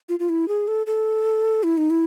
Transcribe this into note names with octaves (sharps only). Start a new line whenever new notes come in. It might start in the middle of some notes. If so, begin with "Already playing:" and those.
F4
F4
E4
G#4
A4
A4
E4
D#4
E4